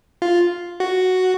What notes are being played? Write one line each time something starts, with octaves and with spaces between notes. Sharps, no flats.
F4
F#4